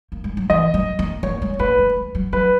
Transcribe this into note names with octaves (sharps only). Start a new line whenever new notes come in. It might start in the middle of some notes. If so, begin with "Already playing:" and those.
A#3
G#3
F#3
E3 D#5
F#3
A#3
A#3 C#5
G#3
A#3 B4
G#3
G#3
F#3
F#3 B4